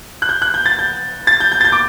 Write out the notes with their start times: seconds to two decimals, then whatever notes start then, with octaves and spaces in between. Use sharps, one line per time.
0.22 F#6
0.29 G6
0.42 F#6
0.54 G6
0.66 A6
0.79 G6
1.27 A6
1.40 G6
1.52 G6
1.61 A6
1.65 G6
1.72 D6